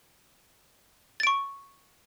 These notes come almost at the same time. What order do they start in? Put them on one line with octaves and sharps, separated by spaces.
A6 D7 C#6